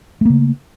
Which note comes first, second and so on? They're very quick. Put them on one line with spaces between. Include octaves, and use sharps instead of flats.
A3 A#3 C#3